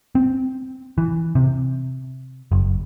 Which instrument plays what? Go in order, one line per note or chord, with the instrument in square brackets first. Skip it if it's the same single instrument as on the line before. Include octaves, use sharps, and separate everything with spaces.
[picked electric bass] C4
E3
C3
F#1